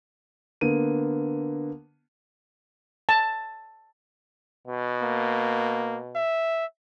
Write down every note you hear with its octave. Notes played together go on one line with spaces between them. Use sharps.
D3 A#3 B3 D#7
A5
B2
A#3
E5